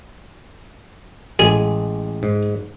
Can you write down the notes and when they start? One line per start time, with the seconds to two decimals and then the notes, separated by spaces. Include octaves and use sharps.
1.39 A1 G#3 G#4
2.23 G#2